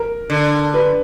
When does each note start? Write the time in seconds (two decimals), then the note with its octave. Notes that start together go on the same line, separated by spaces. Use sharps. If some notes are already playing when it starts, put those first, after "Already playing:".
Already playing: A#4
0.30 D3
0.74 B4